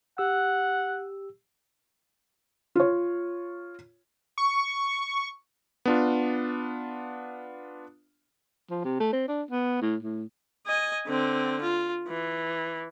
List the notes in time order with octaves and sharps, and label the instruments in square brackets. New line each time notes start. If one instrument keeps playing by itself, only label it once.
[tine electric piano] G4 E6 [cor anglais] F#5
[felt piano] F4 C#5
[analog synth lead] C#6
[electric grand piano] B3 D4 F4
[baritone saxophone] F3
C3
A3
C4
D4
B3
A2
A2
[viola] D#5 G#5
D3 C4
F4
E3